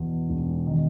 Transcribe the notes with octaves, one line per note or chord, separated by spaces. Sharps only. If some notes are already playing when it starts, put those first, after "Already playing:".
Already playing: E2 B2
E1
D#3